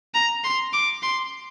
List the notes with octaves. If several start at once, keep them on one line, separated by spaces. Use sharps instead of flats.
A#5
C6
D6
C6